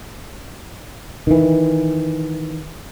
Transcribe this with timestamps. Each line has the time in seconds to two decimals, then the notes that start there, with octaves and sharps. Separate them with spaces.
1.27 D#3 E3